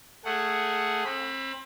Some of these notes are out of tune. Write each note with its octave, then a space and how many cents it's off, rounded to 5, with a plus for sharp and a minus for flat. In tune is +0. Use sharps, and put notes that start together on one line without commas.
A3 +15 G#4 +0 F#5 +0
C4 +35 B5 +0